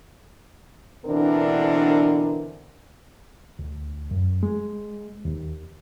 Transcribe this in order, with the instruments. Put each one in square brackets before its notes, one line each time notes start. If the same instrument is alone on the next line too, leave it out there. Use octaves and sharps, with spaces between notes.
[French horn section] B2 D3 E3 C4 D4 A#4
[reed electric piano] D2
F#2
G#3
D#2